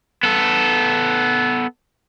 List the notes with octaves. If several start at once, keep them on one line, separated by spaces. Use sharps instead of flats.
B3 A4